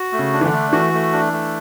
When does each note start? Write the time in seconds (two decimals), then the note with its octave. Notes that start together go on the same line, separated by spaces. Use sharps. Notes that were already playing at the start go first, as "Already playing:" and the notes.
Already playing: F#4
0.12 A3
0.19 C#3
0.33 D4
0.41 E3
0.46 D3
0.53 A3
0.73 E3 F#4
0.93 A3
1.13 D4
1.33 A3